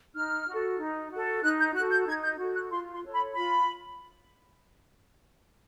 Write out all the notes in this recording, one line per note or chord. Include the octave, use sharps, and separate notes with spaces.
D#4 F6
F#4
A4
D#4
F#4 A4
D#4 F#6
G6
F#4 A4 F#6
G6
D#4 G#6
G6
F#4 A4
F#6
F4 C6
C6
A4 C#5
B5
F4 B5